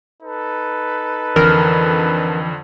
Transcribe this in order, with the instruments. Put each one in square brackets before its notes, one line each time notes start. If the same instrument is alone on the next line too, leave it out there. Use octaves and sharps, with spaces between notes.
[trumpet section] D#4 A4 B4
[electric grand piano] F2 D3 [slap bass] E3 [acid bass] A#4